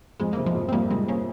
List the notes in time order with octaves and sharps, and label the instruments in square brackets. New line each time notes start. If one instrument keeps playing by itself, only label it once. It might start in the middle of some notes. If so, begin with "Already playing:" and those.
[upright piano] F2 [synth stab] G#3
[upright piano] C3 [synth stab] A#3
[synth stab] F3 G#3
[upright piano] F2
[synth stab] C4
[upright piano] F2 [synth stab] G3 A#3
[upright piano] C3 [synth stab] G#3 C4
[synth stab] A#3 C#4